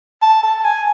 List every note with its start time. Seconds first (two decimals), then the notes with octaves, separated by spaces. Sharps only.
0.22 A5
0.43 A5
0.64 G#5